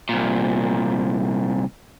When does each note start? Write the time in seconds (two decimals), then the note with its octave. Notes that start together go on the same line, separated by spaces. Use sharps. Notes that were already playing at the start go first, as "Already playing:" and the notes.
0.09 C2 A#2